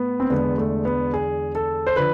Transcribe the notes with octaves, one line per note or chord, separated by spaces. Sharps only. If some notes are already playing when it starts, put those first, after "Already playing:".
Already playing: A2 B3
C4
E2 D3 G#3 B3
A3
B3
G#4
A4
C5
D3 F3 B4